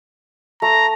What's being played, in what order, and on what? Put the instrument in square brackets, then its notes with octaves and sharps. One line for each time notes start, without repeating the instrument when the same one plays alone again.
[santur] A3 [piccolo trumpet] A#5